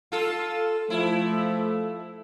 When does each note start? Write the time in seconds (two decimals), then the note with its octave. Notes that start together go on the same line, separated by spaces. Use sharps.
0.12 F4 A4
0.90 F3 A3 E4